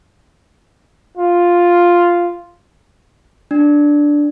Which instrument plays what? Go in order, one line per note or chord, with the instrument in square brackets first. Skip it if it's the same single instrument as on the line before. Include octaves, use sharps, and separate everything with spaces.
[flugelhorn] F4
[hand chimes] D4